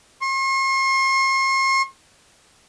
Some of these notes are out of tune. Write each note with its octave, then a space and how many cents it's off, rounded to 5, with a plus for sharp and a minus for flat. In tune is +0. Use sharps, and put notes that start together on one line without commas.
C6 +45